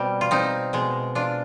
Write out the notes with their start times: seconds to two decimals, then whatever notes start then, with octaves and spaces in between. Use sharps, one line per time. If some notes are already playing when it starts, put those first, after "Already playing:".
Already playing: B2 G3 C4
0.21 F4
0.31 C4 D#4
0.73 B2 G#3
1.15 D4 F4